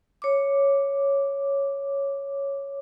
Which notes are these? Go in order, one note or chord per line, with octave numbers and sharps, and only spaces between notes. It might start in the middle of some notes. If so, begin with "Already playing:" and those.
C#5 D6